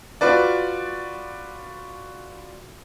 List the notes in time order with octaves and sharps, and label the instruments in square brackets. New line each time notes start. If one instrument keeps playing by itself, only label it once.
[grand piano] F4 F#4 B4 D5